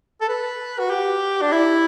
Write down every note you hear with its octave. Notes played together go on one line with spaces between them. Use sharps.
A4
B4
F#4
G4
D4
E4